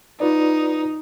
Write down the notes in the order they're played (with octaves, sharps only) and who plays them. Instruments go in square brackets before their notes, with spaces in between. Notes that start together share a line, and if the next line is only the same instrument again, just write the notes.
[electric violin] D#4 [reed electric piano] F4 B4 D5